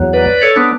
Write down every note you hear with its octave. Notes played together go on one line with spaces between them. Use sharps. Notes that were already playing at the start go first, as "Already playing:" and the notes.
Already playing: E2 F#3
B4 D5
A4 C#5
B3 D4